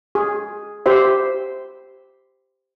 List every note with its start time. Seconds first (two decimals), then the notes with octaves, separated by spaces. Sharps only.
0.15 G#4
0.86 G4 C5 E5